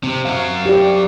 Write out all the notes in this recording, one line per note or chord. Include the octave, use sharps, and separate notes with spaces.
C3 C4
F#2 F#3 F5
G4 D5